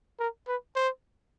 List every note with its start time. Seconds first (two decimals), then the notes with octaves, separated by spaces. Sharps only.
0.19 A#4
0.48 B4
0.76 C5